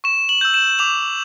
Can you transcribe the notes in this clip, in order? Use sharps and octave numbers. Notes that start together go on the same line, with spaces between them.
C#6 E7
F#7
E6 G6
E7
D6 F7